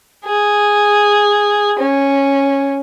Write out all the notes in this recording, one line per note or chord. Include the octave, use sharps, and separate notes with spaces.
G#4
C#4